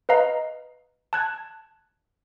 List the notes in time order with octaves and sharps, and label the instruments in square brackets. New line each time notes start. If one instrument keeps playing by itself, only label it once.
[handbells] B4 D#5 F5 A#5
A5 F#6 G#6